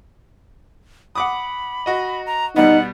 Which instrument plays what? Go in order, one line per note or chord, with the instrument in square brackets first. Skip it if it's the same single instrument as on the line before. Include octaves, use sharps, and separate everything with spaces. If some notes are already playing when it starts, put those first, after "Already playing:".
[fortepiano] F#5 D6 D#6 [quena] B5
[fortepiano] F#4 D#5
[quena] A#5
[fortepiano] B2 G3 B3 [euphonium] D#4 [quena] F#5